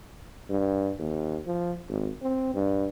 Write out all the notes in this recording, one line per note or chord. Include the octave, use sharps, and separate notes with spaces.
G2
D#2
F3
G#1
C4
G2